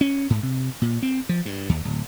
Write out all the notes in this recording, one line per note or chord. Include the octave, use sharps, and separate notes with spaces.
C#4
G#2
C3
A#2
C4
F3
G2
D#2
D1